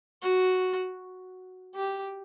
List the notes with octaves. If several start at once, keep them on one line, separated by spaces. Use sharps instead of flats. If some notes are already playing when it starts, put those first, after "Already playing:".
F#4
G4